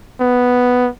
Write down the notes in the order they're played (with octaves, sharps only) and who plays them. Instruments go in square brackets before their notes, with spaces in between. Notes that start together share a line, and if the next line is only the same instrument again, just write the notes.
[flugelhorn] B3